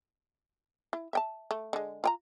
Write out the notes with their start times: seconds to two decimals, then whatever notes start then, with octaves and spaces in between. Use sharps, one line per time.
0.93 E4
1.13 E5 G5 A5
1.51 A3
1.73 D3 G#3
2.04 F4 G5 A#5